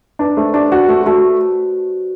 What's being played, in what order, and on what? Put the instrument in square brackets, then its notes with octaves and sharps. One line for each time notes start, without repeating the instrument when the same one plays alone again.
[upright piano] D4 [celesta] B4 D5
[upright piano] A3 [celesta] C5
[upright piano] D4 [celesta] G4
[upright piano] F#4 [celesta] G4
[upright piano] A3 [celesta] G4
[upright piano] A3 [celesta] F#4